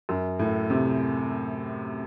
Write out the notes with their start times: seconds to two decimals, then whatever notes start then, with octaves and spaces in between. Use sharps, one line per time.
0.09 F#2
0.39 A2
0.70 C3